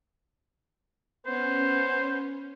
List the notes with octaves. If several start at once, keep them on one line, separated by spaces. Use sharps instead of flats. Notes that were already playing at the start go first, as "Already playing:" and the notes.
B3 C#4 C5